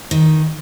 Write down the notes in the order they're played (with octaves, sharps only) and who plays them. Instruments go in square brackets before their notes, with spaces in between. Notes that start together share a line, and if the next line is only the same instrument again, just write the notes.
[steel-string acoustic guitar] D#3